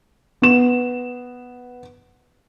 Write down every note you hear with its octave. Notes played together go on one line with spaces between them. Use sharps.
B3 E7